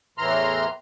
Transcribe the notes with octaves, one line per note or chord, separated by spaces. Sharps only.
E2 A2 E3 A#5 C6 F6